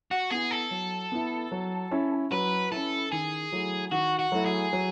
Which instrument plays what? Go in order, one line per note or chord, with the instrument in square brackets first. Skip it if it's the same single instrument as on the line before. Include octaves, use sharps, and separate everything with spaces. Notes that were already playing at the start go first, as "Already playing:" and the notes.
[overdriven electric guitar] F#4
[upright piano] B3 E4 [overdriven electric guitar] G#4
[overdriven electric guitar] A4
[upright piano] F#3
B3 E4
F#3
C#4 E4
[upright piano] F#3 [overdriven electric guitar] B4
[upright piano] C#4 E4 [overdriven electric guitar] A4
[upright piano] D#3 [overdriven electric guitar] G#4
[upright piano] F#3 A3 E4
[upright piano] D#3 [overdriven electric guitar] F#4
[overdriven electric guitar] F#4
[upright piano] F#3 A3 E4
[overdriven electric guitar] G#4
[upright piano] F#3